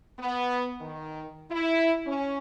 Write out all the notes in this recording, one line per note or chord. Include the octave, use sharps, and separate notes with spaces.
B3
D#3
E4
C#4